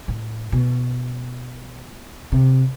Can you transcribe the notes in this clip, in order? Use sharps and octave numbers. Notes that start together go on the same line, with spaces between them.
A2
B2
C3